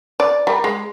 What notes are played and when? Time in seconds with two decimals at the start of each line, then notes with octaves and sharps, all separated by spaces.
0.20 D5
0.47 G3 A#4
0.64 G#3